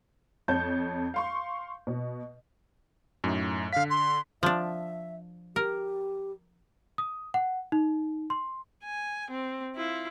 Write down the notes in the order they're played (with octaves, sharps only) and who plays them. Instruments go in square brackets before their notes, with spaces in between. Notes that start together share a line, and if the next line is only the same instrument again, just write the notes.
[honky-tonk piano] F2 C#5 A5 G6
F5 C6 C#6
B2
[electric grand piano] F#2 A2 D#4
[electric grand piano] D3 B6 [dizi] F5
[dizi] C6
[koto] F3 D4 [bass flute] E5
[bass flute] G4 [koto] A#4
[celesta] D#6
F#5
D#4
C6
[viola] G#5
C4
E4 F4